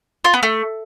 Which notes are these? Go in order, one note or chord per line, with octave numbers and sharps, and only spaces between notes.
F4
B3
A3